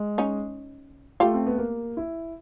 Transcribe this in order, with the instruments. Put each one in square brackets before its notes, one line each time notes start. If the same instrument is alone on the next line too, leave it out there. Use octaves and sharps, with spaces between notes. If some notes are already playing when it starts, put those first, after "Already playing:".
Already playing: [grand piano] G#3
[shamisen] C#4 D#4
[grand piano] A3 [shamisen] F4 G4
[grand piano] C4
B3
A#3
E4